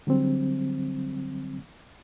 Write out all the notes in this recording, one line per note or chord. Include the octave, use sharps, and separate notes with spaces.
D3 F#3 G3 C4